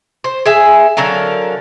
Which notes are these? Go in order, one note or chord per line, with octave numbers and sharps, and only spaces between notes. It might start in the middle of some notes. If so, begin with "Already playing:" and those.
C5
G#4 E5 G#5
D3 F#3 A#4 F5